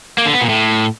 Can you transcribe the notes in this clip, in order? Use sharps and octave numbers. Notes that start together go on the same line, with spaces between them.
A#3
D3
B3
A#2
A2